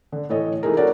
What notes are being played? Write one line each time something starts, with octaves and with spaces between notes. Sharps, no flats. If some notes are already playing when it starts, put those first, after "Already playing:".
D3
A2 E3 A4 C#5 D#5
E3 A3 D#4 G#4 A#4
D4 F#4 A4 A#4 C#5 D5